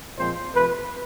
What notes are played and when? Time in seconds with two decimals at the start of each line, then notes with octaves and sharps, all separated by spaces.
0.17 A#2 F3 G#3 C4 C5
0.54 C3 F3 A3 B4